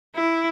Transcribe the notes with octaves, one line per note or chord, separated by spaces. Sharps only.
E4